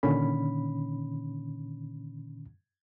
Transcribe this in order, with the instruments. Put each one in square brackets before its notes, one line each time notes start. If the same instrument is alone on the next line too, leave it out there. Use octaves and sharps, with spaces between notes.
[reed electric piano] A#2 D3 D#3 C#4 B5